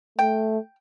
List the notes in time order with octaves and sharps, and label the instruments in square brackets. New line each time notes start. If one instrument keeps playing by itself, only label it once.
[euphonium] A3 [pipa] G5